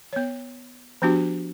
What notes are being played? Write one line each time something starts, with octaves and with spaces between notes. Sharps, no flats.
B3 C#5
F3 B3 D4 F#4 G4